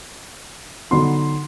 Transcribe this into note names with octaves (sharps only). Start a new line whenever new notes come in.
D3 F#3 B3 D#4 C6